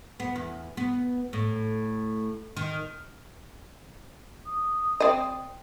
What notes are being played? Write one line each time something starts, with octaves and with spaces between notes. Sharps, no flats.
B3
E2
B3
A2
D#3
D#6
C4 D5 D#5